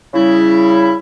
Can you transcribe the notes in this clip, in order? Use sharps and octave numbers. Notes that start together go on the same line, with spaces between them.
C#3 G3 E4